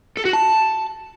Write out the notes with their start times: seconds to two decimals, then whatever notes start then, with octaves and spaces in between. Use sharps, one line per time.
0.17 A4
0.25 F#4
0.33 A5